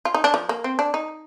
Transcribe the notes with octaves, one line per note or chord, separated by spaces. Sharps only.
F4
D#4
D4
F3
A#3
C4
D4
D#4